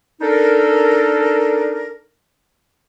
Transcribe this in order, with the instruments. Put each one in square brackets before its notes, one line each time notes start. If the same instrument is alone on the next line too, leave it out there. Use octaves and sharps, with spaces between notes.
[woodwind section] D4 D#4 A4 A#4